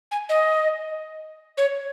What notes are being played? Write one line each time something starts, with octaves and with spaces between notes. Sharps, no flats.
G#5
D#5
C#5